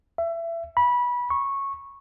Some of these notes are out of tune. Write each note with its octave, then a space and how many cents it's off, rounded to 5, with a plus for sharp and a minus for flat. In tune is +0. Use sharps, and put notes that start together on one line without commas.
E5 +25
B5 -20
C#6 -10